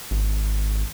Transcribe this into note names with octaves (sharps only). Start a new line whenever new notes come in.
G#1